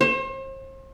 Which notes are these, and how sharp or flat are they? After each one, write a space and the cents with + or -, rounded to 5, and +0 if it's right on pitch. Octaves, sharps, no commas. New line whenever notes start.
C5 +40